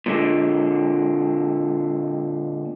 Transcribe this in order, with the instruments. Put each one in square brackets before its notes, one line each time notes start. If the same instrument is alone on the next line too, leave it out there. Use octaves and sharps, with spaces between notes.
[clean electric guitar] A#2 D3 G#3